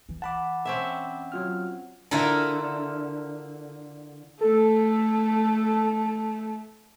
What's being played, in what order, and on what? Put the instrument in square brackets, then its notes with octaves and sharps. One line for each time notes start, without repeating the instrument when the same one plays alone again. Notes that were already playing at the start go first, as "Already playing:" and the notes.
[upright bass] E3
[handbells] F#5 [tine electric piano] A5 B5 D6
[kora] C4 C#4 E5
[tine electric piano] F#3 F4 F6
[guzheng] D3 E4 F4 A4 A#4
[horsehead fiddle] A3 [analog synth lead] A4